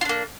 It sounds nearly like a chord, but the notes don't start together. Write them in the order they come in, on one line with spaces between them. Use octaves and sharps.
F4 D4 A#3